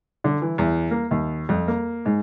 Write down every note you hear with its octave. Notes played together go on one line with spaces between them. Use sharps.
D3
E3
E2
A#3
D#2
F2
A#3
G#2